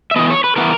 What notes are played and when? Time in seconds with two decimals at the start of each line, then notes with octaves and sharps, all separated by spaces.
0.11 E5
0.16 E3 B3 D#5
0.30 C#5
0.44 B4
0.56 E3 B3 A#4